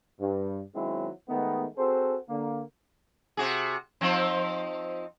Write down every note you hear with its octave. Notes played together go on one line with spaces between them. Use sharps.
G2
D#3 F#3 G#3 C4 C#4 E4
D#3 G#3 A3 B3
C4 F#4 G#4 A4 C5
D3 A#3
C3 F#4 G#4
F3 C4 D#4